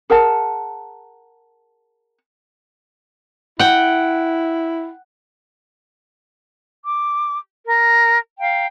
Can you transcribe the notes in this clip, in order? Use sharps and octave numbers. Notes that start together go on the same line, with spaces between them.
G#4 A#4 F#5 A5
E4 F#5 G5
D6
A#4
F5 G5 A#5